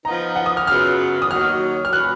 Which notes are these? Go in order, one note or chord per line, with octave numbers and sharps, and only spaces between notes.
F3 B3 D#4 A#5
F#5
D#6
F6
F#2 C#3 F#3 B3 F4 F6
D#6
D#2 D#3 F#3 F6
F6
A#2 F#3 C#4 F#4 B4 F#6